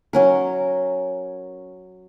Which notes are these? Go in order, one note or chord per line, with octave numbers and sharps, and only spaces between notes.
F#3 C#4 A#4